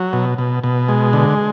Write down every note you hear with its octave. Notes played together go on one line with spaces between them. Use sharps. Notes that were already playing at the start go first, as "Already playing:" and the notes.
Already playing: F#3
B2
B2
B2
G#3
D3